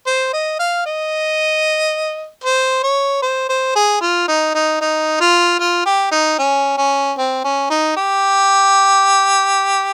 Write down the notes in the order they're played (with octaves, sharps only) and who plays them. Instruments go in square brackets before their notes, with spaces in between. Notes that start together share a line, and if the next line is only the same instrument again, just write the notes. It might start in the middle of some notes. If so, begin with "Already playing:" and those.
[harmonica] C5
D#5
F5
D#5
C5
C#5
C5
C5
G#4
F4
D#4
D#4
D#4
F4
F4
G4
D#4
C#4
C#4
C4
C#4
D#4
G4